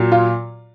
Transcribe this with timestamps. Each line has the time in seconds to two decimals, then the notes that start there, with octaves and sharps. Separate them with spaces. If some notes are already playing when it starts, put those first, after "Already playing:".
Already playing: A#2 F#3
0.12 F4